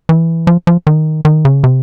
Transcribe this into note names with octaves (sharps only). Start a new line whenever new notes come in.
E3
F3
F3
D#3
D#3
C#3
C3